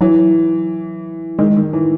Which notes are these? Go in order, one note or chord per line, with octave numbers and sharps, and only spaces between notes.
E3 F#3
D#3 G#3
D#3
E3